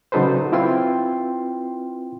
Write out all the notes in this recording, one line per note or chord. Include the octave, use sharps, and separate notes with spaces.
C#3 F#3 D#4 A4 B4 C5
C4 E4 F4 B4 G5 C6